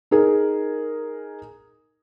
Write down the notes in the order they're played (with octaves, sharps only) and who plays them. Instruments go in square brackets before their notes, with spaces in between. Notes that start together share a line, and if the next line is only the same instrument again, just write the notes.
[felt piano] D#4 G#4 A#4